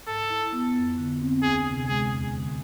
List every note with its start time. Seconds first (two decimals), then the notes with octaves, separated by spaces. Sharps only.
0.08 G#2 A4
0.30 E4
0.53 B3
0.76 F2
0.98 D3
1.21 C4
1.43 D2 G#4
1.66 C3
1.88 G#3 G#4
2.11 E2
2.34 D3